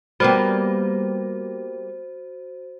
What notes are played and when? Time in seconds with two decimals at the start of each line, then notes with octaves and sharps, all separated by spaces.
0.20 G3 A#3 B3 F#4 C5